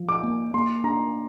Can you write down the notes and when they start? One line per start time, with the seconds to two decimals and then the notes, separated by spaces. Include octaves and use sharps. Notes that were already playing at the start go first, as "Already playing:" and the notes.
Already playing: F3
0.09 D6
0.23 A#3
0.54 A#3 C6
0.84 D4 A#5